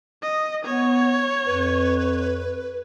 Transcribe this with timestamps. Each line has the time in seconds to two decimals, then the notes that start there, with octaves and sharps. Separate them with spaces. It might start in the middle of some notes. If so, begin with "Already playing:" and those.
0.23 D#5
0.65 B3 C#5
1.46 F2 B4